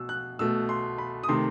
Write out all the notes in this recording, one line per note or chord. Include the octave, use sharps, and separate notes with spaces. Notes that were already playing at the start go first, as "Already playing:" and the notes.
Already playing: B2 E6
F#6
B2 A3 E6
C6
B5
D#6
C3 D#3 A3 C6